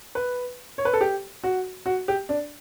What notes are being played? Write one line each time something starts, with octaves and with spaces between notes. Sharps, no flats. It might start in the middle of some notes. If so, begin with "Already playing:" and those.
B4
C#5
B4
A4
G4
F#4
F#4
G4
D4